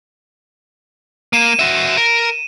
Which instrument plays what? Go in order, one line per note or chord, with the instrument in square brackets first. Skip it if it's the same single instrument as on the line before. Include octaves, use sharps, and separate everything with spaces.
[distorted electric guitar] A#3 [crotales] D#7 E7
[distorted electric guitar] F#4 E5
A#4